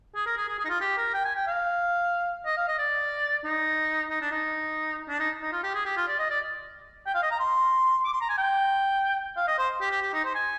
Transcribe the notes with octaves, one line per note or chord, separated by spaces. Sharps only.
G#4
A#4
G#4
G#4
G#4
D#4
F4
G4
A#4
G5
G#5
G5
F5
D#5
F5
D#5
D5
D#4
D#4
D4
D#4
D4
D#4
D#4
F4
G4
G#4
G4
F4
D5
D#5
D5
G5
F5
D#5
A#5
C6
D6
C6
A#5
G#5
G5
F5
D#5
C5
G4
G4
G4
D#4
C5
G#5